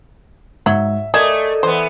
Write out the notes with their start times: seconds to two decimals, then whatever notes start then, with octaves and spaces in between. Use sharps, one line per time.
0.66 G#2 F#3 E5
1.14 A3 G#4 A#4 D5 D#5 D#6 G#6 E7
1.63 E3 B3 C5